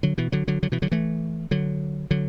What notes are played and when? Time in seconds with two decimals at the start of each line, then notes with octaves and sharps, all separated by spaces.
0.03 D3 F#3
0.18 B2 E3
0.32 D3 F#3
0.48 D3 F#3
0.63 D3 F#3
0.72 B2 E3
0.82 D3 F#3
0.92 E3 A3
1.51 D3 F#3
2.11 D3 F#3